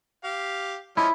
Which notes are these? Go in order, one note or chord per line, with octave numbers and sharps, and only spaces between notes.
G4 F5
F3 C#4 E4 D#5